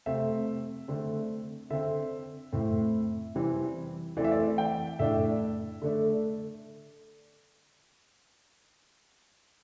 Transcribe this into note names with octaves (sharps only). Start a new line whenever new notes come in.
C3 A3 C4 E5
D3 A3 C4
D3 C4 E5
A2 A3 C4
C3 E3 G3 C4
E3 A3 C4 D5
E5
D5
G5
A2 A3 D4 E5
D3 A3 D4